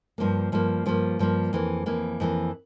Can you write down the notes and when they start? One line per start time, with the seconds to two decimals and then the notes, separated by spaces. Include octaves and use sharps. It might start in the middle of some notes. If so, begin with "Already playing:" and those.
0.18 G2 F3 A#3
0.52 G2 F3 A#3
0.86 G2 F3 A#3
1.19 G2 F3 A#3
1.53 F2 E3 A#3
1.86 F2 E3 A#3
2.20 F2 E3 A#3